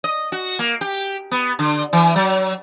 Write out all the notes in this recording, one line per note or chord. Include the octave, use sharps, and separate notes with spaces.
D#5
F#4
A#3
G4
B3
D3
E3
F#3